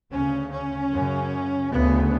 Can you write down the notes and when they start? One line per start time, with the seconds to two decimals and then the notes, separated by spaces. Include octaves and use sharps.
0.11 D2 C#3 C#4
0.51 C#4
0.91 F#2 C#3
1.70 D2 C#3 B3